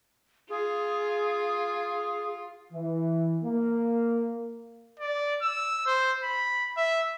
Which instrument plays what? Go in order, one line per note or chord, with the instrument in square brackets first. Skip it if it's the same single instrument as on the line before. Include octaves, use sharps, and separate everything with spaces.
[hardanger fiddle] F4 [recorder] G#4
[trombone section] E3
A#3
[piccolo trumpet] D5
E6
C5
B5
E5